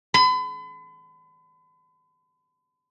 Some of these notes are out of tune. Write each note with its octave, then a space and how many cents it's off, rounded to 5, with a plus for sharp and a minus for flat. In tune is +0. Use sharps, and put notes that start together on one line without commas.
B5 +40